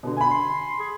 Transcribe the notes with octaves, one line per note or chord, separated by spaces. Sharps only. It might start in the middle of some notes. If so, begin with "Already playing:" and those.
B2 D3
G#5 B5
C6
G#4